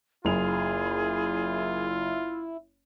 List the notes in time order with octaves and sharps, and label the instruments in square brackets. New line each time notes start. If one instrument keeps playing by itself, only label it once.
[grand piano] F#1 F7 [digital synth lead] E4 [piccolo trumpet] F4 [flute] G#4